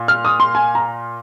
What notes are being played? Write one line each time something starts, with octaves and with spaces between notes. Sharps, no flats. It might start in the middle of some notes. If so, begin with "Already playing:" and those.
Already playing: A#2
F6
D#6
C6
G#5
A#5